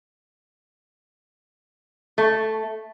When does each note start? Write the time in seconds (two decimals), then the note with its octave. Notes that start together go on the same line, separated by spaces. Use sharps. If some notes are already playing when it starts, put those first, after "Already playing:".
2.18 A3